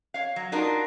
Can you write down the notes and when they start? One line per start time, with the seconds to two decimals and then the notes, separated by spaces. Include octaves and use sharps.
0.14 C#5 F5
0.36 F#3
0.52 D4 D#4 F4 F#4 A#4